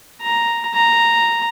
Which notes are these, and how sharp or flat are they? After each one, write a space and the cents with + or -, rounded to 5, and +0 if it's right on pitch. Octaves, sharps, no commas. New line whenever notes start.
A#5 +0
A#5 -5